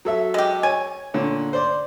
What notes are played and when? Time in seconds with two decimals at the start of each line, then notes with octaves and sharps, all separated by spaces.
0.05 F#3 A4 E5
0.34 G#3 G4
0.63 C#5 G#5
1.14 A#2 D3 C#5
1.53 C5 D5 C6